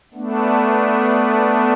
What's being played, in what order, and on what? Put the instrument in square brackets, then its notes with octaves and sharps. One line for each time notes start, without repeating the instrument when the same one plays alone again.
[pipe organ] A3 B3 D4